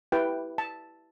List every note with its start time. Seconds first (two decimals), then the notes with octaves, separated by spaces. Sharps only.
0.12 E4 G4 B4 G5
0.58 A5